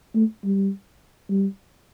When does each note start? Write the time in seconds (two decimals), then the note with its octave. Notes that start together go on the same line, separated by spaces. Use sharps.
0.15 A3
0.44 G3
1.30 G3